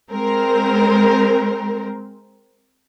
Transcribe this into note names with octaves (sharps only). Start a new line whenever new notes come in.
G#3 C4 A#4